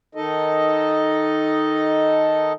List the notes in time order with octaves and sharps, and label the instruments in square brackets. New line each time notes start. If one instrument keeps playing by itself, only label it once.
[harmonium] D#3 D#4 A4 D#5